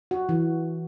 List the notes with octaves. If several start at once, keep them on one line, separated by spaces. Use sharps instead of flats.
F#4
E3